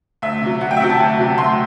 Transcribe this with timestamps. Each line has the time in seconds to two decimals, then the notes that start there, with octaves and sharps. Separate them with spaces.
0.22 D2 E5
0.42 C3 F#3
0.61 D2 F#5
0.71 G5
0.77 E5
0.80 C3 F#3 F#5
0.90 A5
0.99 D2
1.19 C3 F#3
1.38 D2 C6